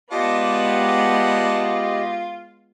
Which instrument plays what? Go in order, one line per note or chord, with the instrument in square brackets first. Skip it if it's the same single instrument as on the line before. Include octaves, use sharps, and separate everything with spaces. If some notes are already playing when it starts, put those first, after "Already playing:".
[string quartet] G#3 B3 [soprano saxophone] F4 [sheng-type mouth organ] G4 D#5 [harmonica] D5 F#5 A5